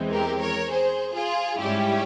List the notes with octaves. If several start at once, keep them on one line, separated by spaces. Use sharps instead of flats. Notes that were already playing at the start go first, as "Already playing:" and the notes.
Already playing: E2 E3 G#3 C4
G4 A#4
A#4 C#5
G#4 C5
F4 G#4
G#2 G3 C#4 E4 G4